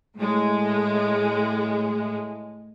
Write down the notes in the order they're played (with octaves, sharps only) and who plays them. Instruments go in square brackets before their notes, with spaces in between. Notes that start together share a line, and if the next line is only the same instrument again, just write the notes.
[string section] A2 G#3